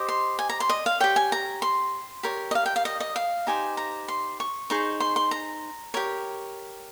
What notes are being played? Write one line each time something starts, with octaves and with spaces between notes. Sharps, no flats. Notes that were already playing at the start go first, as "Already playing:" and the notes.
Already playing: G4 C5 D#5
C6
G#5
A#5
C6
D#5
F5
G4 C#5 G5
G#5
A#5
C6
G4 A#4 C#5
D#5
F5
G5
F5
D#5
D#5
F5
D#4 G4 C5 G#5
A#5
C6
C#6
D#4 G#4 C5 C#6
C6
C6
A#5
G4 A#4 C#5